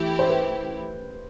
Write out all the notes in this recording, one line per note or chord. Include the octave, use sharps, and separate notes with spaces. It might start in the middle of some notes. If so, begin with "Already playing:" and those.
Already playing: E3 A3 E4 G4
C5
B4